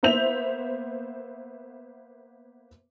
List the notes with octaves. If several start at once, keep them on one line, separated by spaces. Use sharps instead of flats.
A#3 B3 C5 E5 G6 F7